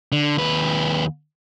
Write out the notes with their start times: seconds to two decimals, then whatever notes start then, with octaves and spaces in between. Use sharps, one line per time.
0.12 D3
0.37 D#2 B4